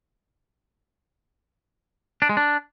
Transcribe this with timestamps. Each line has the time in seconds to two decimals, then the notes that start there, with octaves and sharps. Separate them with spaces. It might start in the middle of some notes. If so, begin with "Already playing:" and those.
2.22 D4
2.29 G#3
2.37 D4